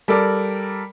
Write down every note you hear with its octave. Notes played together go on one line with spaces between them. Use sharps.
G3 A4 A#4 D5